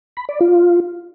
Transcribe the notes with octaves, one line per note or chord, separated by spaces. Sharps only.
B5
D5
F4